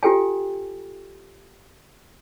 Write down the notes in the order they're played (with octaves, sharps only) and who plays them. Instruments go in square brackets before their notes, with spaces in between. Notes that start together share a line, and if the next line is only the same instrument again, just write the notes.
[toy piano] F4 G4 A4 G5 G#5